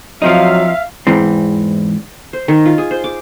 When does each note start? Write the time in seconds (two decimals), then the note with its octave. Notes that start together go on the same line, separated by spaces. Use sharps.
0.22 F3 F#3 C4 D#4 E5 F5
1.07 E2 G#2 E3 C4
2.33 C5
2.48 D#3
2.66 F4
2.78 G#4
2.91 C5
3.04 D6